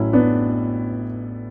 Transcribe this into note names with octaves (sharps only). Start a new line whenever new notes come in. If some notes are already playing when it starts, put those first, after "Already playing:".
Already playing: A1 A2 F#3 C#4 E4
B3 D4